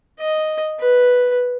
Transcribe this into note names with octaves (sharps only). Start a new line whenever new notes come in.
D#5
B4